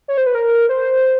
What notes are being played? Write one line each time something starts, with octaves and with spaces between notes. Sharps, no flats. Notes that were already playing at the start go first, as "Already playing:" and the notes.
C#5
C5
B4
A#4
C5